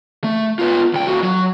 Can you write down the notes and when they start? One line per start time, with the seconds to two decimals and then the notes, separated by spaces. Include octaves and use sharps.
0.24 A3
0.59 B3 F4
0.93 C#2 G5
1.07 A2 F#4
1.23 F#3